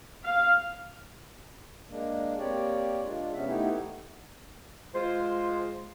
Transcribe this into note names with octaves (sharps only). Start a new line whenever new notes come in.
F5
G#3 A#3 D4
A#3 C4 G4 C#5 D5
G#3 D4 F4
C3 B3 C#4 E5
A3 B3 D#4 E4 G4
G#3 F4 C5